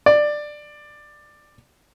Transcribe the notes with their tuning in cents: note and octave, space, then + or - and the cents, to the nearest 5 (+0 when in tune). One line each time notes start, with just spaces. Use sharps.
D5 +15